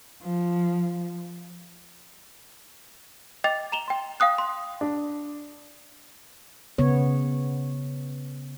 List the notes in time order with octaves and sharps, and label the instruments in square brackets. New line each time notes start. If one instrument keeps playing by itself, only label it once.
[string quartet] F3
[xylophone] D#5 G5 D6 A6 F7
A#5 E7 F7 G7
G5 C6
F5 G5 D#6 F#6
C6
[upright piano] D4
[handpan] C#3 B3 C#5